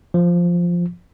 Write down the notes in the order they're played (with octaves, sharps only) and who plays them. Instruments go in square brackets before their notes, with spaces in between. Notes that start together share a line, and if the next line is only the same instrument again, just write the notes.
[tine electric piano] F3